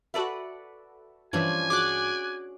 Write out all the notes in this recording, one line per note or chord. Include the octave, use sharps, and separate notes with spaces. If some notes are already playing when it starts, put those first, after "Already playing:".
F#4 A4 B4 D5 E5 F#5
G2 E3 F3 C#4 D4 G#5
F#4 G#4 D6 F#6